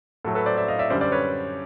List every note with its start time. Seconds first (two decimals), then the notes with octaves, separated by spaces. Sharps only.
0.24 A2 F#3 A3 A4
0.35 A4 B4
0.46 C5 D5
0.57 D5 E5
0.68 D#5 F5
0.79 D5 E5
0.90 F#2 D3 G3 C5 D5
1.01 C5 D5
1.12 B4 C#5